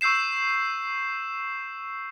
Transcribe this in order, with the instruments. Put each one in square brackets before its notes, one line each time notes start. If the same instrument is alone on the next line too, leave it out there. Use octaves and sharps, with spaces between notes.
[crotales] C#6 E6 G6 C7 E7